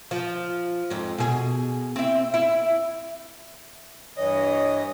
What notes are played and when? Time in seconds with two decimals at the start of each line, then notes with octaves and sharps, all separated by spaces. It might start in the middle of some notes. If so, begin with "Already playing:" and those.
0.11 F3
0.90 F2 G#2
1.18 B2 G#4
1.96 C4 E4
2.34 E4
4.17 G2 E3 C#5 D#5